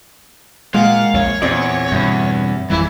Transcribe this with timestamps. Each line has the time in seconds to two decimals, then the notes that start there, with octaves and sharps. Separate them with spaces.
0.74 A#2 G#3 A#3 F5 F#5
1.14 A#1 E2 C#5
1.42 E2 A#2 C4 D5
1.92 E2 G2 B2 D3
2.70 G#1 F2 E3 G3 E4